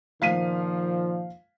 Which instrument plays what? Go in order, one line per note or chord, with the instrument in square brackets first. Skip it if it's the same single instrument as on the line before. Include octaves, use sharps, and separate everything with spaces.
[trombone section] A#2 D#3 F3 [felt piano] F5 B6 D#7